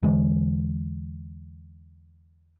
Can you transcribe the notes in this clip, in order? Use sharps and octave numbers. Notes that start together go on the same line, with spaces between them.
E2 D3 E3 G#3